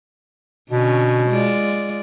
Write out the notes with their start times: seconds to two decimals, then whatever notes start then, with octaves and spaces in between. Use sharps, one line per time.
0.70 B2 D3 C#4
1.29 G#3 F4 D5